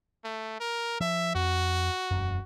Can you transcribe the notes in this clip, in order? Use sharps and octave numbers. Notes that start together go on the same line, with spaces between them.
A3
A#4
F3 E5
F2 F#4
E1 F#2